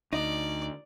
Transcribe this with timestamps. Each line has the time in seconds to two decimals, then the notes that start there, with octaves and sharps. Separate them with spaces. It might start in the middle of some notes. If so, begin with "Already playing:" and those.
0.13 D2 D#4 D5